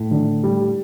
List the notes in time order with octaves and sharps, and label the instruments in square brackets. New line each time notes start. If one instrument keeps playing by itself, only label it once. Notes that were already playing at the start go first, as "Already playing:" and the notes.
Already playing: [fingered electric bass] A2
[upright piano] D3
G3